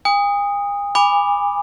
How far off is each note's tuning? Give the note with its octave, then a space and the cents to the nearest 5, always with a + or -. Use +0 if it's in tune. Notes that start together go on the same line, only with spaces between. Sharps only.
G#5 -45 D#6 +0
G#5 -30 B5 +0 D6 +10